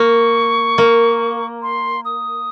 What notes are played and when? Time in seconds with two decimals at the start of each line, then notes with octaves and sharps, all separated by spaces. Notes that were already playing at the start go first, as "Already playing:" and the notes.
Already playing: A#3 C#6
0.78 A#3
1.62 C6
2.05 D#6